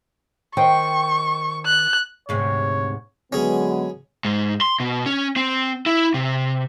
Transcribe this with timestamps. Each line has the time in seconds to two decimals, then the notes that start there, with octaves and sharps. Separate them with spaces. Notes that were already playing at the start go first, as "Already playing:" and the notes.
0.57 D#3 C5 G5 C#6
1.66 F#6
2.29 D2 G#2 C3 C#5
3.33 D3 F#3 G#3 B3 C#4 G#4
4.25 G#2
4.61 C6
4.80 B2
5.06 C#4
5.36 C4
5.86 E4
6.14 C3